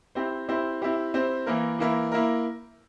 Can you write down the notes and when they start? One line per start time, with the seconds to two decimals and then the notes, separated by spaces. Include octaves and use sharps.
0.15 C4 E4 G4 C5
0.48 C4 E4 G4 C5
0.82 C4 E4 G4 C5
1.14 C4 E4 G4 C5
1.46 E3 A#3 E4 A#4
1.79 E3 A#3 E4 A#4
2.12 A#3 E4 A#4